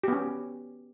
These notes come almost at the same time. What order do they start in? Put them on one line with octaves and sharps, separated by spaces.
G4 B3 C#4